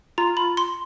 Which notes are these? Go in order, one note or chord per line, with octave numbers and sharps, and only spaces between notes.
F4 A#5
B5
C6